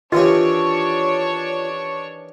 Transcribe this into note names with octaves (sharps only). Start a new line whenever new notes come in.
D#3 E3 D4 F4 G4 C#5 C#6